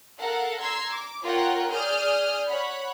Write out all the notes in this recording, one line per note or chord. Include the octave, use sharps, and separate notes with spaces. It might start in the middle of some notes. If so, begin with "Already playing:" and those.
A4 A#4 F5 F#5
A#5 C6 E6 G#6 C7
D6
F4 A#4 C#5 F#5 G5
G#4 D5 D#6 F6 G6
C#5 F#5 B5